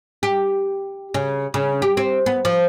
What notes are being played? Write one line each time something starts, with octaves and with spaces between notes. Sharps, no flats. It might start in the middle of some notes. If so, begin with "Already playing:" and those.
G4
C#3
C#3
G4
C4
B3
F3